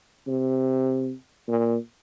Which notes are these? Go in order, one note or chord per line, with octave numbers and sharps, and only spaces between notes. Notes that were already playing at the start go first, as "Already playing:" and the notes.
C3
A#2